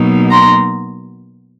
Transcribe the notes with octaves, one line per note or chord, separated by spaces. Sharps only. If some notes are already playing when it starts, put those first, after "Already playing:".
Already playing: B2 F#3 A#3 D#4
A#5 C6